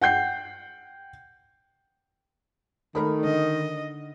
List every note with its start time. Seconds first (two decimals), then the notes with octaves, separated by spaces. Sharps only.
0.02 F#5 G5 G6 C7
2.95 D#3 A3 A#4 B5
3.24 D3 D#5